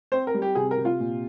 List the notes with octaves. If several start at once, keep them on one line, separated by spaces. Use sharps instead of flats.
C4 C5
A#4
G3
G4
C3 G#4
A#4
C3
F4
A#2